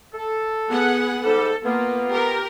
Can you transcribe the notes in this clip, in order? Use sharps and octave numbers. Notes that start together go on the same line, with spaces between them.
A4
B3 G#4 F#5
G#2 G3 A4
A#3 B3 F4
G4 A#4